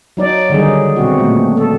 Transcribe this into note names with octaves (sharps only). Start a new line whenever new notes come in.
F#3 D#4 D5
D3 D#3 G3 D#4 G#4
B2 C4 F#4
A#2 A3
A4